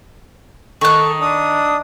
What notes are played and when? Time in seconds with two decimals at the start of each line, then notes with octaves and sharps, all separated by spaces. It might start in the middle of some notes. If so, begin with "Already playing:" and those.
0.81 D#3 A4 C#6 F#6
1.21 D4 D#6